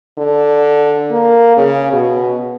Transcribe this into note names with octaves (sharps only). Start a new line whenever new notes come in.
D3
A#3
C#3
B2